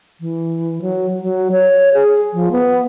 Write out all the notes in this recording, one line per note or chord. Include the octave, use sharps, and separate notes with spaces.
E3
F#3
F#3
C#5
G#4
F3
B3